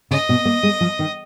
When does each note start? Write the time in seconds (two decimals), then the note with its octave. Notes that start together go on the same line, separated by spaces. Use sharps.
0.11 C#3 D#5
0.29 B2
0.45 A#3
0.63 G#3
0.81 F3
0.99 D#3